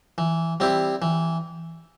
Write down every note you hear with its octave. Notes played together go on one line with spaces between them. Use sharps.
E3
G3 C4 E4 G4
E3